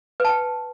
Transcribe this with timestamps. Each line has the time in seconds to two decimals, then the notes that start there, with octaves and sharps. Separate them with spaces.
0.20 B4
0.25 A5
0.29 G5